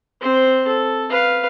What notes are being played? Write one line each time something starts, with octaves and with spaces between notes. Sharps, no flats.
C4 C5
A4
B4 F5